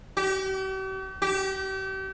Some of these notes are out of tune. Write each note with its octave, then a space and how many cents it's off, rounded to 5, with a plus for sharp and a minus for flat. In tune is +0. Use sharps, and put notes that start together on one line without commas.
G4 -45
G4 -35